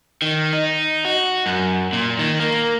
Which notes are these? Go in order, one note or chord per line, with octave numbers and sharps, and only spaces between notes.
D#3
D#4
F#4
F#2
A#2
D#3
A#3